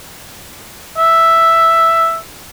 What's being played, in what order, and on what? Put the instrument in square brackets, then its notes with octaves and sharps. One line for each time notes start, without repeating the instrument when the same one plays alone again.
[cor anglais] E5